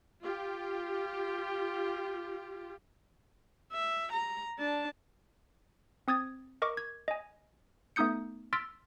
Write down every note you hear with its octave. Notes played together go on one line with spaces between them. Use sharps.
F4 G4
E5
A#5
D4 A5
C4 D#6 G#6 A6
A#4 D#5 C#6 D6
G#6
D#5 G#5
A3 B3 D#4 D#6 G6 C#7
C6 E6 F6 A6 B6 D7